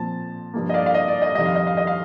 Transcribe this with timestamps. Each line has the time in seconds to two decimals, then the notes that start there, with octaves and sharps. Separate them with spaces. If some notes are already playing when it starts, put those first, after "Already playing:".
Already playing: A#2 F3 C4 A5
0.54 G2 F3 A#3
0.69 D#5
0.74 D5 F5
0.86 F5
0.94 D#5
1.08 D5
1.22 D#5
1.35 F2 D#3 G3 D#5
1.46 F5
1.55 D#5
1.67 F5
1.77 D#5
1.87 F5